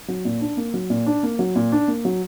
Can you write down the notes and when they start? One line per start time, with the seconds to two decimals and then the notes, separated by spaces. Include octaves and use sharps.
0.08 F#3
0.25 A#2
0.41 D4
0.57 A#3
0.74 F#3
0.90 A#2
1.06 D4
1.23 A#3
1.39 F#3
1.55 A#2
1.72 D4
1.88 A#3
2.05 F#3